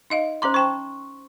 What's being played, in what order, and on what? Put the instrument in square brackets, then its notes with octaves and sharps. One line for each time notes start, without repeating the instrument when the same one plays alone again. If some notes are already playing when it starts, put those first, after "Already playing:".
[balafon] D#4 D#5 F5
[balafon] C#4 A#5 D6 [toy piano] C5 C6
[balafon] C5 G5 A5 [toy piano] C#6